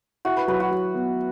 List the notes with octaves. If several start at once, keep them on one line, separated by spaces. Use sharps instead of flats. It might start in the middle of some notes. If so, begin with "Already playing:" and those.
E4 F#4
B4
F#3 B4
F#4
F#3
B3